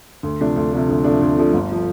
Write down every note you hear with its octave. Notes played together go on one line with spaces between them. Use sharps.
D2
C3 F3 A3 D4
D2
C3 F3 A3 D4
D2
C3 F3 A3 D4
D2
C3 F3 A3 D4
G1
F3